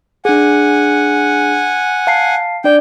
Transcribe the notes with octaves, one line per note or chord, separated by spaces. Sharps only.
D4 G#4 F#5 G#5
F5 A5 C7
D4 D5 G5